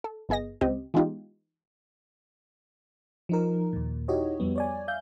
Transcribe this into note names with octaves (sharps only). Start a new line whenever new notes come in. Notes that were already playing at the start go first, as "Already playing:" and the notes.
A4
G1 B3 G#4 D#5 A#6
C#2 C4 G4 D#5
E3 G#3 B3 D#4 F4 G4
F3 D#4 A#4
D#2 A#2
D#4 E4 F#4 G4 C#5 D#5
F2 G3 B3
C#5 D5 G#5
E5 F5 G6